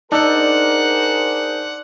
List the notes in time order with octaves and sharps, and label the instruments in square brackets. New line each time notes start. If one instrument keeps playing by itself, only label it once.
[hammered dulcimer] D4 D5 [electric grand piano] D#4 E6 [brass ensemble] G#4 A#4 C5 [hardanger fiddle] F#5